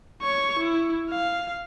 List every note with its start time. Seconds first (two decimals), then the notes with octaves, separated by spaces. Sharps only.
0.22 C#5 C#6
0.59 E4
1.10 F5